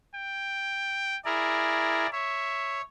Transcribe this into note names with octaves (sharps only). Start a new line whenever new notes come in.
G5
E4 G#4 A#4 D5
C#5 E5